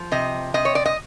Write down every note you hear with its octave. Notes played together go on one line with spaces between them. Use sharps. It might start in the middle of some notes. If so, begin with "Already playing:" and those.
Already playing: F3
C3 D#5
C3 D#5
C#5
D5
D#5